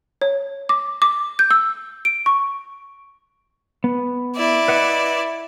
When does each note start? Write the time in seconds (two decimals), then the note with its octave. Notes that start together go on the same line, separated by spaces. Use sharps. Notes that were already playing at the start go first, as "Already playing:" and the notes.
0.22 C#5
0.69 D6
1.02 D6
1.39 G6
1.51 E6
2.05 D7
2.26 C#6
3.84 B3
4.36 E4 D5
4.68 B4 D#5 F#5